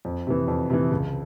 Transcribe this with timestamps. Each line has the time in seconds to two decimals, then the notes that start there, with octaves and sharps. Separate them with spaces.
0.05 F2
0.27 C3 E3
0.48 F2
0.70 C3 E3
0.91 C#2